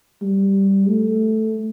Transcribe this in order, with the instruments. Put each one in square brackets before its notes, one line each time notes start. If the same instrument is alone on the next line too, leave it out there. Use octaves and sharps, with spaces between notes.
[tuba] G3
A3